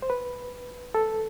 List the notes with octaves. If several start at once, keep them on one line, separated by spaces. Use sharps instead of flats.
C5
B4
A4